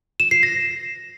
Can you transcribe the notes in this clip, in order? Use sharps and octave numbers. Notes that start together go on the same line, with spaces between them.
E7
C7
A#6